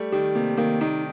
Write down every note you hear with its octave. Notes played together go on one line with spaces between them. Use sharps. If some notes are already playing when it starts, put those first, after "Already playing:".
Already playing: G3 A3
D#3 G4
C3 A#3
D#3 A#3
D#3 D#4